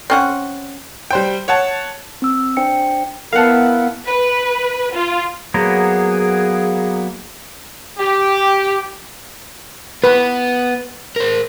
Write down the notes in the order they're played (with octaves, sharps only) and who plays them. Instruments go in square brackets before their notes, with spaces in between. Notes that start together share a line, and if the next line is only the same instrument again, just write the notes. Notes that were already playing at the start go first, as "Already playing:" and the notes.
[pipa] C4 C#4 F#5
[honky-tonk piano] G3 C5 G5
C#5 F#5 A5
[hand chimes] C4 E6
D4 C5 G5 C#7
[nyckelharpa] B3 E4 [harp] A#4 B4 A5 [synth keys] F5 F#5
[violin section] B4
F4
[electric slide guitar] F#3 A#3 B3 [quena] G#4
[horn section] G4
[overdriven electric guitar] B3 [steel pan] B4
[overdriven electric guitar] A#4 C5